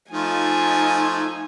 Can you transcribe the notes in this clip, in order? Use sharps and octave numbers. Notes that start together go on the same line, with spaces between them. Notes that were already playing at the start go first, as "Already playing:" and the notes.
F3 A3 D#4 F4 G#5